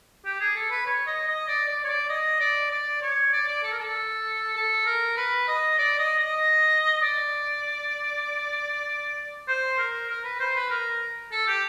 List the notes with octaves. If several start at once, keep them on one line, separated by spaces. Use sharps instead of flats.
G4
G#4
A4
B4
C#5
D#5
D#5
D5
D5
C#5
D5
D#5
D5
D5
C#5
D5
D5
A4
A#4
A4
A4
A#4
B4
D#5
D5
D#5
D#5
D5
C5
A#4
A#4
B4
C5
B4
A#4
A4
G4